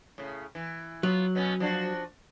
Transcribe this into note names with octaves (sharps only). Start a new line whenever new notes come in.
A2 C#3
E3
F#3 B3 F4
B2 B3 C#4
F3 D4 F#4